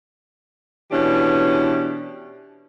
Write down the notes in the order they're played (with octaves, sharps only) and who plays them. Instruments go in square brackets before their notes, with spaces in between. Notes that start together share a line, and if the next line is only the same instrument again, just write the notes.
[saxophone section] B2 E3 C#4 D4 G4